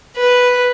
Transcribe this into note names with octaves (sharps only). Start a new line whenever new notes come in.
B4